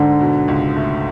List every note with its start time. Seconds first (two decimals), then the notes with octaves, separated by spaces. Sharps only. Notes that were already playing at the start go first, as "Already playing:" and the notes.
Already playing: G#2 D3
0.20 B2
0.48 C#2
0.76 A3